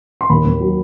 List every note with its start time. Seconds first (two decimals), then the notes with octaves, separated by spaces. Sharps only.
0.21 C6
0.30 D#2 B5
0.45 D#2
0.60 F#3